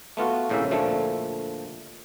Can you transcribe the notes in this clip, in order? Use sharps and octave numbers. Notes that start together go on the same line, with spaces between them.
A3 B3 F4 F#4
A#1 A2 C#3 A#3 C#4 E5
D2 A#2 F3 A3